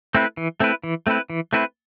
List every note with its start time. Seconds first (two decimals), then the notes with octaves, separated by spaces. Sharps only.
0.14 A3 C4 E4 B4
0.37 E3
0.60 A3 C4 E4 B4
0.84 E3
1.07 A3 C4 E4 B4
1.30 E3
1.53 A3 C4 E4 B4